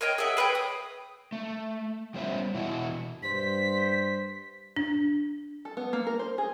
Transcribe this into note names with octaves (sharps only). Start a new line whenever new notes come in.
A#4 C#5 D#5 G5
G#4 D#5 E5 F#5
G#4 B4 C#5 G5
D#6
A3
G3 B3 C#4 C5 E5
B2 E3 E4 F#4
G2 C5 B6
D4
A4
B3
A#3
A#4
C5
G#4